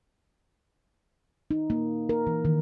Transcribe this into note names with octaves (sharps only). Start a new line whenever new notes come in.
D#4
A#3
A#4
E3
D#3